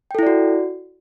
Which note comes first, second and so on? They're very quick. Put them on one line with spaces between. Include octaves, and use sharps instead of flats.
G5 A4 E4 D5 F#4